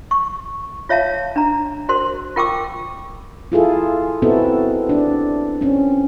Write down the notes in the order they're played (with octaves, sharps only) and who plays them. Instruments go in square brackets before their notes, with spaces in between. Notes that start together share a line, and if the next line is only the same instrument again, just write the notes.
[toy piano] C#6
F4 C#5 E5 F5 A5
D4 A#5
F#4 A#4 C5 C6
F4 A#4 G5 C#6 D6 E6
[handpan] E4 F4 G#4 A4
B3 C4 D#4 E4 F#4 A4
D4
C4 C#4